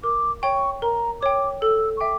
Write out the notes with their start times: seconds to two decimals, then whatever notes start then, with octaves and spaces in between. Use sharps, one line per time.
0.04 A#4 D6
0.42 C#5 G5 C#6
0.82 A#4 A#5
1.21 C#5 G5 D6
1.62 A4 E6
1.97 C#6
2.00 E5 G5 D6